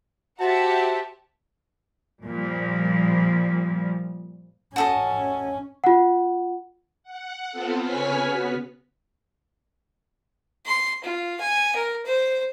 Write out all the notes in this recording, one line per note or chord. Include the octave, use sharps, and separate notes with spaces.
F#4 G4 C5 E5 F#5 A5
A#2 F3 G3
C#4 F#4 A4 D#5
F4 F#5
F#5
B3 C4 F4 A4
C#3 B4 C#5 G#5 F6 B6
B3 F#4
C6
F4
G#5
A#4
C5